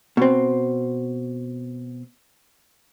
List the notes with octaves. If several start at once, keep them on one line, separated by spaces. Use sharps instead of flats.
B2 C4